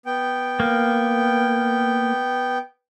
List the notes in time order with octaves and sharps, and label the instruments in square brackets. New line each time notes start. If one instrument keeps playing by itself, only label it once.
[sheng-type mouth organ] B3 G5
[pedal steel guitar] A#3